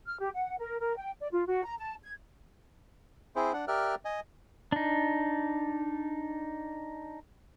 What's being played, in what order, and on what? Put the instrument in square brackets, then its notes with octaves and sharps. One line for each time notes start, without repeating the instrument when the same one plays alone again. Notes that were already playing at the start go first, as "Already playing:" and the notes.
[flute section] F6
G4
F#5
A#4
A#4
G5
D5
F4
F#4
A#5
A5
G#6
[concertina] C4 E4 G#4 C5
D4 F#5
G4 A#4 D5 E5 F6 F#6
D#5 G#5
[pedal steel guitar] D4 D#4